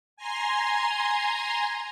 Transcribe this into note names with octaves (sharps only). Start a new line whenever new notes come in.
G#5 A#5 C6